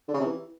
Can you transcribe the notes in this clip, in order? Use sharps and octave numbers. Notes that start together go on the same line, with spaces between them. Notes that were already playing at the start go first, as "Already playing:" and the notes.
D3
C#3
C3
E3